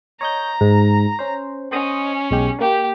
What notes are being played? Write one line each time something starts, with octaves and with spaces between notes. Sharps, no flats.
C#5 D#5 A#5 G6
G#2
C#4 C5
C#4 C5 D#5 D#6
B1 G#3 G4
A#3 G4